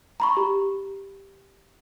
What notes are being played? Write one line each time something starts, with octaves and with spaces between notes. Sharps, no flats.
A#5 B5 C#6
G4